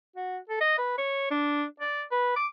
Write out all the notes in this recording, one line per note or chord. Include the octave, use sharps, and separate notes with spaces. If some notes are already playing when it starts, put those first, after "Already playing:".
F#4
A4
D#5
B4
C#5
D4
D5
B4
D6